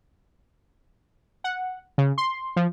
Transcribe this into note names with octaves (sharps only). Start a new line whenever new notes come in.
F#5
C#3
C6
F3